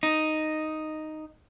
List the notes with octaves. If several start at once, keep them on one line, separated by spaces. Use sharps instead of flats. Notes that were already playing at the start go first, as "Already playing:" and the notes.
D#4